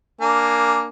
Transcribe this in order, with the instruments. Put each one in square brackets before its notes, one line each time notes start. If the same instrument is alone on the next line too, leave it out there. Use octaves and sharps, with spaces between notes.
[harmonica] A#3 D4 G#5